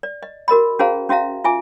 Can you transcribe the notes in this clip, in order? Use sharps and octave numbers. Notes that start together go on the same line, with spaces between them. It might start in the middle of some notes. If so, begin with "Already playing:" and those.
D5
D#5
F#4 A#4 D#5 B5
C#4 F#4 G#4 C5 F5 A#5
C#4 F#4 E5 F5 A#5
F4 E5 G#5 D6